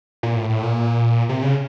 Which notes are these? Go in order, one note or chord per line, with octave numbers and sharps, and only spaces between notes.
A#2
A2
A2
A#2
C3
C#3